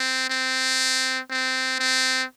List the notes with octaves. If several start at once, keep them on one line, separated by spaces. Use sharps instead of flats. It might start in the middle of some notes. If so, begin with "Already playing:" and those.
Already playing: C4
C4
C4
C4